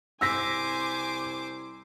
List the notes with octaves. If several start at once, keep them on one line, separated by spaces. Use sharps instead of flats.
C2 C5 G#5 D6 E6 A#6 B6